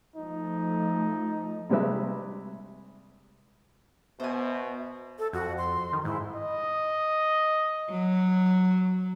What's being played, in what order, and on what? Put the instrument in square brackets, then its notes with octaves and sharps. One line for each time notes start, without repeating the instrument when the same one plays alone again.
[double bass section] F3 A3 [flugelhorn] D#4
[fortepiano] C3 G3 G#3 G4 B4 E5
[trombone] B2 [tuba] B3 [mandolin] C5 G#5 [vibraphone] E5
[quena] A4
[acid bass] F2 [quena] F#4
[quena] C6
[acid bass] D#3
[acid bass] G#2 [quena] E4
[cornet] D#5
[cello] F#3